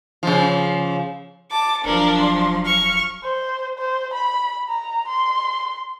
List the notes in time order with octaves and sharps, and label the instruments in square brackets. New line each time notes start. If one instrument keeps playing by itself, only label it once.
[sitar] C#3 F3
[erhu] A5 [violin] D6
[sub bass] D#1 [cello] F3 F#3 [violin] D4 [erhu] A#4
[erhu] C6
[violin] C#6 [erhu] F6
[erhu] C5
C5
B5
A#5
C6